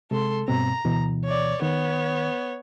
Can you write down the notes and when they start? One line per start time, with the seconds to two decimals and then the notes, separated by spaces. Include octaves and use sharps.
0.11 C3 G#3 A4 C6
0.48 G2 B2 C4 A#5
0.85 D2 B2 E3
1.25 C#5 D5
1.62 D#3 B3 C#5